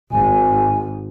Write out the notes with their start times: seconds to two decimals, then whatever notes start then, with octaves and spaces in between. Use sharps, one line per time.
0.11 G#1 G#5